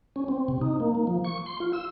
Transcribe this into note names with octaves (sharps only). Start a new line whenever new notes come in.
C#4
C4
C3
D#4
A#3
A#3
F3
C#6
C6
F4
E6